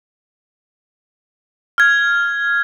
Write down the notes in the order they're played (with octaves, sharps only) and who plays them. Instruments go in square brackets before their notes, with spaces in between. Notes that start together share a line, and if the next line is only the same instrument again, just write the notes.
[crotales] F6 G#6